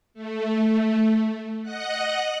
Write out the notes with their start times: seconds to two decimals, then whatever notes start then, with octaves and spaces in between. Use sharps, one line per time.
0.14 A3
1.63 D#5 F#5 F#6